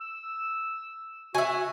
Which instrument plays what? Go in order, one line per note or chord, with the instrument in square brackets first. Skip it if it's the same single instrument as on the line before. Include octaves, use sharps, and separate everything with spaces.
[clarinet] E6
[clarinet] F#4 [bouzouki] E5 G#5